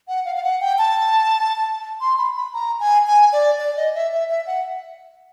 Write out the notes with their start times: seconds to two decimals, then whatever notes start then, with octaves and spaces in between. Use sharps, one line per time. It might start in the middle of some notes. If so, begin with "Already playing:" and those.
0.08 F#5
0.25 F5
0.36 F5
0.44 F#5
0.61 G5
0.78 A5
2.01 C6
2.18 B5
2.36 B5
2.53 A#5
2.80 G#5
3.07 G#5
3.33 D5
3.59 D5
3.77 D#5
3.95 E5
4.12 E5
4.29 E5
4.47 F#5